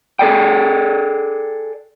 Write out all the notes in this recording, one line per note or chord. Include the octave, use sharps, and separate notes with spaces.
G#4 A4 D5 G5